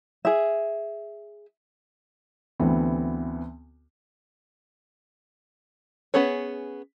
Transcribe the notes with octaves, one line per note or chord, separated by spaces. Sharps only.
G#4 E5
D2 E3 B3 C4
B3 C#4 G#4 C#5